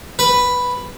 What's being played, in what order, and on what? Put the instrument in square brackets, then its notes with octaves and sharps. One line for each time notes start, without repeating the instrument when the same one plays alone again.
[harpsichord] B4